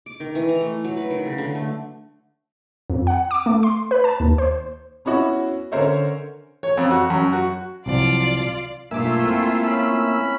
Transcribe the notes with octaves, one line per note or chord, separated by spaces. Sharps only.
D6
D#3
E3
A#5
A3
F#3
B4
D#3
C#3
D3
A3
F2
F#5
D6
A3
C6
B4
A5
D#2
C5
B3 C#4 E4 F#4
D3 C#4 A#4 C5 C#5 E5
C#5
F2
F#4
F#2
F#4
C2 F3 F#3 F4 D5
B1 G2 A3 A#3 F4 E5 G#5 D6
C4 E4
C#4 B5